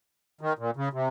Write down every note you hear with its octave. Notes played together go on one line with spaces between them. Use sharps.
D#3
A#2
C#3
C3